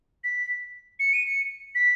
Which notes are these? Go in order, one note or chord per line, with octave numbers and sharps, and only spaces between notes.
B6
C#7
D#7
C#7
B6